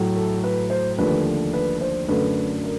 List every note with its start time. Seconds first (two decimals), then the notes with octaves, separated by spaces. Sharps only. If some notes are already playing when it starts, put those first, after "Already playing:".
Already playing: A2 F#3 A3
0.16 A4
0.44 B4
0.70 C5
0.98 D#2 D3 F3 A3 B4
1.53 B4
1.81 C5
2.08 F#2 D3 F#3 A3 B4
2.63 A#4